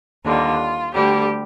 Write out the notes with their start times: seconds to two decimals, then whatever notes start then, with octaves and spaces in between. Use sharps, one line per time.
0.24 D#2 D3 G3 F4
0.94 D2 D3 G3 G4